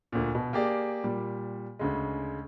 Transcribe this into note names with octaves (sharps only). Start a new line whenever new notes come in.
D2 A#2
B2
A#3 G4 G#4 D5
A#2 G3
D2 C#3 G#3